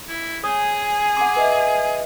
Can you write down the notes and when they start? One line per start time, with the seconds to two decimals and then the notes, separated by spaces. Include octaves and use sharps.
0.08 E4
0.44 G#4 C#5 G#5 D#6
1.16 F#5 C6 D6
1.36 B4 D#5 E5